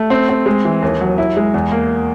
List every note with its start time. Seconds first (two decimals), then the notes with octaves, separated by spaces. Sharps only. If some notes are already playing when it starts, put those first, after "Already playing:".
Already playing: A3
0.10 C4
0.29 C4
0.46 G#3
0.65 E3
0.82 D#2
1.01 F#3
1.18 E4
1.37 G#3
1.54 E2
1.72 A#3